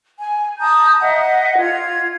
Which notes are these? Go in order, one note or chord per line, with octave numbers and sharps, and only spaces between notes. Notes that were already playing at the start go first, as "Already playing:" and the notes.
G#5
A5 A#5 D#6 G6
D#5 E5 F#5
F4 G#6